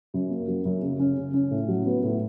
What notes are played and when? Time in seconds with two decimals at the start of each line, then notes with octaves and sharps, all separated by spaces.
0.14 F#2
0.30 A#3
0.48 F#3
0.65 F#2
0.82 C#3
1.00 C#4
1.17 C#3
1.34 C#4
1.51 A2
1.68 F#3
1.86 B3
2.03 A2